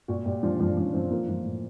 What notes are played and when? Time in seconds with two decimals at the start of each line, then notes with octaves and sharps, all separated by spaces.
0.08 A#2 F#4
0.25 A#2 G4
0.43 F3 D4
0.60 F3 D4
0.76 F3 C#4
0.94 F3 C4
1.10 F3 A#3
1.29 F3
1.45 A2